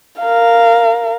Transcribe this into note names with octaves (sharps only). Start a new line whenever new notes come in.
A#4 F5